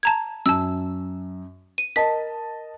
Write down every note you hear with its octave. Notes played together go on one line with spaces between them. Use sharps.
A5 A#5 G#6
F#2 A5 E6
D#7
A#4 D#5 A5 B6